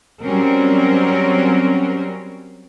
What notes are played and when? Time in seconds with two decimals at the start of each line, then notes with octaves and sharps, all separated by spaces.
0.22 F#3 G3 C4 C#4 A#4